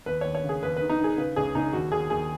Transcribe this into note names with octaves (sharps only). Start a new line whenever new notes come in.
D#2 B4
D#2 C#5
C#5
C#3 G#4
D#2 B4
D#3 B4
D#4
D#3 G#4
C#3 B4
C#2 G#4
C#2 D#4
D#2 F#4
D#2 G#4
D#2 G#4